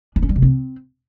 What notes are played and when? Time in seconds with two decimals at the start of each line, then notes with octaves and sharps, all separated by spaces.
0.16 D4
0.23 C#4
0.29 G3
0.36 C3
0.42 C4